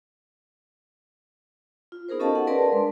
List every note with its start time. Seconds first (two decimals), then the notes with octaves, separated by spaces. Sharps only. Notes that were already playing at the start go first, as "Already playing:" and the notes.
1.92 F4
2.09 B3 D#4 G#4 A#4 C5
2.20 C#4 F#4 A4 D#5 F5 A5
2.35 F#5
2.47 G#4 A#4 B4 D5 A5 C6
2.72 G#3 D4